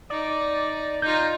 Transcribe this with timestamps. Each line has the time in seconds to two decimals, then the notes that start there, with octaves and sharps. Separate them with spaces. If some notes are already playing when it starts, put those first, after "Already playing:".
0.10 D#4 D5
1.02 D#4 F4 G6